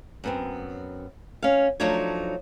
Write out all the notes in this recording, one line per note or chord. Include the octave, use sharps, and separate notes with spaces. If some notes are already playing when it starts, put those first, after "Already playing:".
F#2 B3 C4
C#4 F5
F3 F#3 A3 D4 D#4 C#5